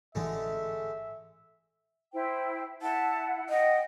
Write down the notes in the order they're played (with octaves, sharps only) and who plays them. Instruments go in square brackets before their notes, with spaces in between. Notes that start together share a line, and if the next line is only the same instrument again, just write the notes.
[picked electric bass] A1 G#2 E3 [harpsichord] D3 G#3 A3 [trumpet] E5
[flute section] E4 C5 G5
[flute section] E4 F#5 [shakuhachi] A5
[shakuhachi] D#5 [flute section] F#5 G5